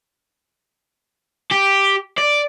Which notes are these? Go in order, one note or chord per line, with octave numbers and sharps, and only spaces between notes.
G4
D5